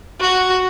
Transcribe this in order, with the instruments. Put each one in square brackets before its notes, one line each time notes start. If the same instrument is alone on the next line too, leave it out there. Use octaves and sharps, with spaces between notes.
[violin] F#4